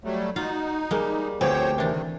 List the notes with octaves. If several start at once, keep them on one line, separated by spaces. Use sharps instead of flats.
F#3 G3 A3
D#4 F4 F#4 F5
G3 G#3 A#3
D2 F3 B3 C4 G4 C5 C#5 G5
C3 D#3 E3 D4